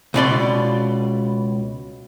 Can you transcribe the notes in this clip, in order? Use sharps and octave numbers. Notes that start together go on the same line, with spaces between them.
C#2 B2 D5 C6